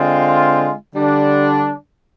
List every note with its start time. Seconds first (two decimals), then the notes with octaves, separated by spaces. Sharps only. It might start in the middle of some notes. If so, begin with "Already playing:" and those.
Already playing: D3 G#3 C4 F4
0.93 D3 G3 D4